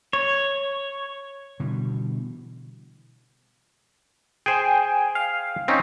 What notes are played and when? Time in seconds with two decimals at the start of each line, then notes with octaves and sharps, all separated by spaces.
0.13 C#5
1.60 B2 D3 E3 G3
4.46 G#4 C5 G5 G#5
5.15 F5
5.68 C4 C#4 D#4